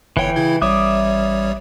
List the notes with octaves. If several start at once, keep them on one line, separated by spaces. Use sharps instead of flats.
G1 E3 C#5 G5 C#7
C#3 E4 G#6
A1 G3 C#5 E5 D6 D#6